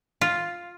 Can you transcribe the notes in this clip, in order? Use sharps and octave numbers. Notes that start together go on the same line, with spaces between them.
F4